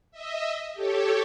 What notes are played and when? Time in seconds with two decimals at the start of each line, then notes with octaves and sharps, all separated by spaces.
0.11 D#5 E5
0.74 G4 A4 C#5